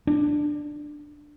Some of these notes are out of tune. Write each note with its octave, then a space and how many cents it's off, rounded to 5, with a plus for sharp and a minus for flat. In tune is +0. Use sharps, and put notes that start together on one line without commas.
D4 +10